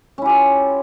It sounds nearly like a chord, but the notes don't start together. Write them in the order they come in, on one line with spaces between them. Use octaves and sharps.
C#4 E4 G4 F4